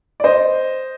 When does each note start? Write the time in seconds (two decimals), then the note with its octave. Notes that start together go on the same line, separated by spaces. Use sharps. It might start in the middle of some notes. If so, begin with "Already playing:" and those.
0.20 D5
0.24 C5 D#5